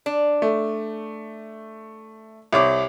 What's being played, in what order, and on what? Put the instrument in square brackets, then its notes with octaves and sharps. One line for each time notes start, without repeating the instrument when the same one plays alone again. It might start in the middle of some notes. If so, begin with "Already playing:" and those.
[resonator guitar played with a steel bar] D4
[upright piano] A3
C2 C#5 D6